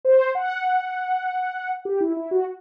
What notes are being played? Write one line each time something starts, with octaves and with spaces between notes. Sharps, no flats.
C5
F#5
G4
E4
E4
F#4